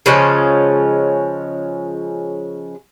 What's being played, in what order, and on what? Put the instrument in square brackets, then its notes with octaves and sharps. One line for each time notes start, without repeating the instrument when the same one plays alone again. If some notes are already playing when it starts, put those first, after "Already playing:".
[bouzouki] C#3 F3 G#3 C#4